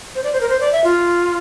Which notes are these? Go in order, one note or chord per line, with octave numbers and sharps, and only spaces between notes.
C5
D5
C5
A#4
C5
D5
E5
F4